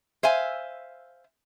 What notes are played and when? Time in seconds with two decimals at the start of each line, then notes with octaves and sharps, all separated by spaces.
0.23 C5 E5 F5 G#5